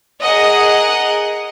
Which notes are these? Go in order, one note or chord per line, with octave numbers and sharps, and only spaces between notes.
G#4 A#4 D#5 F#5